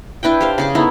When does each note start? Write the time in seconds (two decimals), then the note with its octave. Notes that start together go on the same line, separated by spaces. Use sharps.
0.23 D4 E4 B4 G5
0.41 G4 C5 F5
0.58 C#3 G#4 D6
0.75 A3 B3 D#4 E4